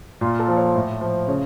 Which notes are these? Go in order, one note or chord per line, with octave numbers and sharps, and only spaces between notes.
A#2 F4
A4
F3
C#5
A2
F3
C#3 C#5